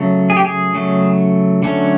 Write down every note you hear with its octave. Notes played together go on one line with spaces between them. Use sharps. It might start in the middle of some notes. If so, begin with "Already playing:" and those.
Already playing: C#3 F#3 A3
G#4
G4
G#4
C#3 F#3 A3
D3 F#3 A3 C#4